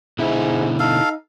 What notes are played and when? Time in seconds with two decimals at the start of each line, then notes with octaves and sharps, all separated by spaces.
0.19 G#2 B2 D3 E4 E5
0.79 D#4 A4 F5